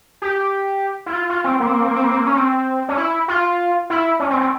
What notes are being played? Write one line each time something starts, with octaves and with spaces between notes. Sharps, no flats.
G4
E4
F4
F4
C4
A#3
C4
A#3
C4
A#3
C4
A#3
C4
A#3
C#4
C4
C#4
E4
F4
E4
C#4
C4
C4